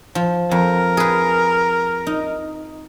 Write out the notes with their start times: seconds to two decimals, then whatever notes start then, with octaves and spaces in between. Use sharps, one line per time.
0.15 F3
0.51 F2 A#4
0.97 G#4 B4
2.07 D#4